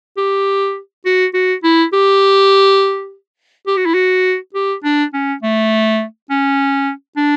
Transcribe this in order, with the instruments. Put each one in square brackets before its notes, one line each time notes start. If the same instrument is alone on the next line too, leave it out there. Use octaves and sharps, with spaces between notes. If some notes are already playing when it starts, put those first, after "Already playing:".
[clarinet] G4
F#4
F#4
E4
G4
G4
F#4
E4
F#4
G4
D4
C#4
A3
C#4
D4